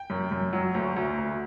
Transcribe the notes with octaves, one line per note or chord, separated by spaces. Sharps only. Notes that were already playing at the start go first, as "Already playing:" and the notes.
Already playing: G5
F#2
F#2
F#3
D2
D2
D2